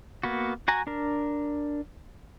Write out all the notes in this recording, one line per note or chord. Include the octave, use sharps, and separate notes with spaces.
A#3 B3 F#4
F#4 G#5 A#5
D4 A#4